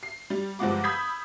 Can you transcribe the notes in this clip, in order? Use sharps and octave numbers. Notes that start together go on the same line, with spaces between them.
C7
G3
G1 F3 G3 G#3 F#5 D6
B5 D#6 E6 G6 G#6 B6